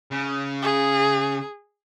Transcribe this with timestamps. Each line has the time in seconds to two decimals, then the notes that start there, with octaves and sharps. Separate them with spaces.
0.11 C#3
0.63 G#4